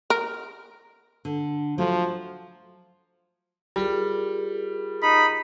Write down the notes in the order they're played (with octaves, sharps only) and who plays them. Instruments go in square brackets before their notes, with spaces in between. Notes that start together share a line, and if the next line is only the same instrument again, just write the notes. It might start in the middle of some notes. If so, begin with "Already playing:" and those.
[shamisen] A#4
[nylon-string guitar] D3
[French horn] F3 [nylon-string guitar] F#3 A3
[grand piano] G3 [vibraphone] F4 G#4 A#4
[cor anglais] D#4 [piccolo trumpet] B5